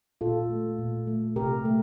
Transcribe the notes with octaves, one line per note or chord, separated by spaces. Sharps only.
A#2 F4 A4
A3
A#2
A3
C3 G4 A#4
A3